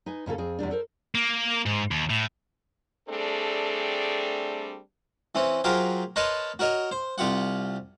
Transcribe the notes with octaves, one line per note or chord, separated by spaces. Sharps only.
D#4 B4 G#5
G#2 C#3 A#3 A4
F2 C4 G#4
E2 C3 G3 D4
A4 A#4 C5
A#3
G#2
D#2
A2
G3 A3 C4 D4 G#4 A4
E3 C4 C#4
F#3 F4 G4 G#4 A#4 C5
A#4 B4 C#5 D#5 A5 C6
F#4 A#4 C#5 D#5
C5
C2 F4 G4 F#5